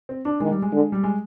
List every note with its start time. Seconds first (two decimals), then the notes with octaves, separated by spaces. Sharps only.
0.09 C4
0.25 D4
0.40 D#3 G#3
0.51 G3
0.62 G#3
0.72 D3
0.92 G3
1.03 G#3